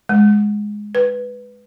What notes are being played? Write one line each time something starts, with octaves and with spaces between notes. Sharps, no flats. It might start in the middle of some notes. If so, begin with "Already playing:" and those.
G#3
B4